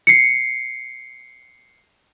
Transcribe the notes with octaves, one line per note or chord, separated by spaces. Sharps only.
C7 C#7